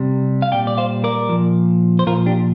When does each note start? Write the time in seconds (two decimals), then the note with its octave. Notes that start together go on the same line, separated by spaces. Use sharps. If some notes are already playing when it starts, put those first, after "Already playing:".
Already playing: C3 G3
0.42 F5
0.52 A#2 G3 D5 G5
0.67 D5
0.78 C5 F5
1.04 A#4 D5
1.29 A#2 F3
1.99 C5
2.06 A#2 F3 F4 A#4
2.26 D4 G4